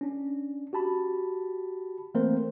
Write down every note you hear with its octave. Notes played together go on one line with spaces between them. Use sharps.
C#4 D4
F#4 G4 A5 B5
E3 A3 A#3 C4 A#4 C5